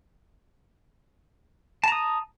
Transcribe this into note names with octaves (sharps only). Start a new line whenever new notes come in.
A5 A#5 D#6